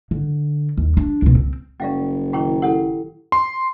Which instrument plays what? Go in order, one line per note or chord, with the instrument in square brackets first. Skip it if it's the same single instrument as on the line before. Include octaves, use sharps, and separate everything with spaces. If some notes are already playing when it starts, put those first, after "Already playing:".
[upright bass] D3
D#2
D4
C#2 B2
C4
[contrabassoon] F#1 [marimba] F#3 G3 C#4 [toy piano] D5 F5 G5
[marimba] A#2 D#3 E4 [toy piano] G5 A#5 C#6
[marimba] E4 G4 [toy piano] A4 F#5
[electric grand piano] C6